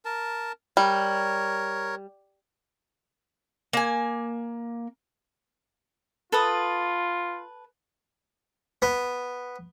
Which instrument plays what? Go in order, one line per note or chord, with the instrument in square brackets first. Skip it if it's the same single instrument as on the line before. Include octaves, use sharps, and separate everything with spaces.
[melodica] A#4 A5
[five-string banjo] G3 [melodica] A#4 C#5
[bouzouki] A#3 G#5
[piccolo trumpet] F4 [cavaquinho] A4 B4 D#6
[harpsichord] B3